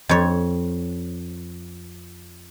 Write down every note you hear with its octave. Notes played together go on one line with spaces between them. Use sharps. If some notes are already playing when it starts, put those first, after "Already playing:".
F2 C#5